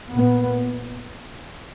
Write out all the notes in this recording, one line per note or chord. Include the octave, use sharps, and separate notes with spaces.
A#2 B3